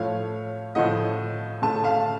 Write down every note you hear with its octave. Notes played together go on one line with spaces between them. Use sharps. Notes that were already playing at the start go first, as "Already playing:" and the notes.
Already playing: A2 F3 A3 C#5 F5
A2 F3 A3 D#5 F#5
A2 A3 A5
F5 A5